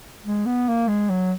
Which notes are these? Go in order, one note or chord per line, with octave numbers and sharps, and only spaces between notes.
G#3
B3
A#3
G#3
F#3